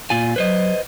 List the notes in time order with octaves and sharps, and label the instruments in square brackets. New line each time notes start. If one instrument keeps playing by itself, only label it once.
[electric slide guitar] A#2 F4 G#5
[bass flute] F#3 [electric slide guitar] B4 C5 D#5